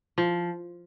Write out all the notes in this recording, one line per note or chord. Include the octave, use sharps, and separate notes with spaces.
F3